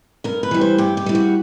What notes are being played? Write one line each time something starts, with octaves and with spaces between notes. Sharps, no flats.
G2 A#4
B4
E3 G3
C5
G2 G4
G4
E3 G3
F#4